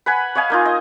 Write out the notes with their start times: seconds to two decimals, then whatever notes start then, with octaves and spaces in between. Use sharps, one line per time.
0.06 B4 F#5 G#5 B5
0.35 C#5 D#5 F5 G#5
0.50 A#3 D#4 F4
0.65 D#5